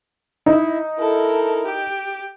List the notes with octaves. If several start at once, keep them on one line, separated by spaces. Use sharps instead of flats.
D#4 E4
E4 A4 A#4
G4